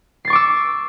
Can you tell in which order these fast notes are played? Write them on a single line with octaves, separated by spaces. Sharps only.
C7 A6 C#6 D6 E6